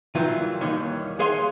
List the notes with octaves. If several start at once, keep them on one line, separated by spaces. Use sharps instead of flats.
D#3 E3 F#3 G3 F4
D#2 D#3 E3 G3 C#5
G#3 G#4 C#5 F5 G#5 C6